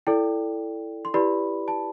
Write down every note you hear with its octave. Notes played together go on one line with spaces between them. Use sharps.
E4 A4 D5 G5
C6
E4 G4 B4 D5 B5
A5